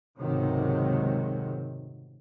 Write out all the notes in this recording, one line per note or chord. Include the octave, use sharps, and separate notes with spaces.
F1 C#2 G#2 C3 D#3 F#3